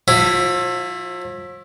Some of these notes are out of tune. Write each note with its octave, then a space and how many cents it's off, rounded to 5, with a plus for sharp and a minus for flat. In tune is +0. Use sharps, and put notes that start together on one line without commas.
F3 +40 E4 +10